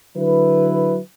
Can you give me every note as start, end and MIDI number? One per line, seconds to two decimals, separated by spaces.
0.16 0.98 50
0.16 0.98 54
0.16 0.98 64
0.16 0.98 71